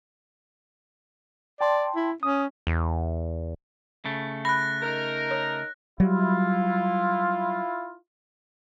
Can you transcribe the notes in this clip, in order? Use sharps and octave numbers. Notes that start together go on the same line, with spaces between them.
D5 G5 A5 C6
E4
C#4 D#6
E2
C#3 A3
B5 F#6 A#6
D#4 A#4
C#5
F#3 G3 E4 F4